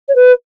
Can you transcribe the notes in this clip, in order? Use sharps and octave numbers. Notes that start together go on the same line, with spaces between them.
C#5
B4